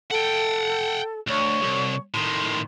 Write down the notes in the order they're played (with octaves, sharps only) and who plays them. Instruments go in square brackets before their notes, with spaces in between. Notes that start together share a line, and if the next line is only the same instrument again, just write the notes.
[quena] A4 [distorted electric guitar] F#5 G5
[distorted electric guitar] D2 [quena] C#5
[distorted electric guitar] C2
[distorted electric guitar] A2 D#3 [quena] C6